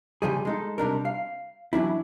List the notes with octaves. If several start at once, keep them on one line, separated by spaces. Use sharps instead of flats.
C#3 F3 G3 G#4
G#3 D#4 A4
C3 G3 D4 A#4
F5
E3 F#3 D4 E4